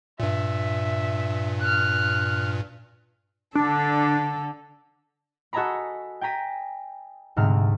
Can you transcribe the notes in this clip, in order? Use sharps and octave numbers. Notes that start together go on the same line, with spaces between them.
G2 A#2 E5
F6 F#6
D3 D4 A4
F#4 A4 D#5 G#5 A#5 B5
G5 G#5 A#5 B6 D#7
D2 G#2 C3 F6